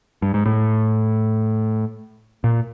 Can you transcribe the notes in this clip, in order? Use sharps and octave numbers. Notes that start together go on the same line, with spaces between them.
G2
G#2
A2
A#2